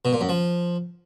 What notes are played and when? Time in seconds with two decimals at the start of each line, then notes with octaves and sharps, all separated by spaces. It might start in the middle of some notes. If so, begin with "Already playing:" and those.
0.05 B2
0.13 A#2
0.21 F#2
0.29 F3